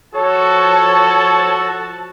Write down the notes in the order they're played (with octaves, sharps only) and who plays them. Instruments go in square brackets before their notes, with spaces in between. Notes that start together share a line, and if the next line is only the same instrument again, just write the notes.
[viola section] F3 A5 [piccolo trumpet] F#4 [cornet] A4 [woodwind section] C#5